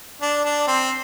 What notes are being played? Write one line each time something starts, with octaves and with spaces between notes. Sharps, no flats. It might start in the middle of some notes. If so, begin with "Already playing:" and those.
D4
D4
C4